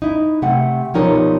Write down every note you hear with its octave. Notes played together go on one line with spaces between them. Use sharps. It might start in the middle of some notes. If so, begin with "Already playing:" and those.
D#4 E4
C3 A3 C4 F#5
B2 F3 G3 D#4 A#4 C#5